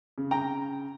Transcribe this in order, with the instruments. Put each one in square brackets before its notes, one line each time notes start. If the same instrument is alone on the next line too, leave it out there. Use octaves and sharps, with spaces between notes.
[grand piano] C#3
[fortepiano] G5 A#5